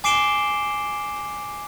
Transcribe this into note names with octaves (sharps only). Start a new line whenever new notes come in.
G#5 D6 C7 D7 E7 G7